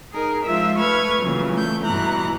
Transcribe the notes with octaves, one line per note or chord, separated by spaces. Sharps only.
D#4 G#4 A#4
F3 G#3 F4 E5
A3 B4 C#6 F6 G#6
A#2 C#3 E3 F#3
A3 G6
G2 B2 E3 A#5 F#6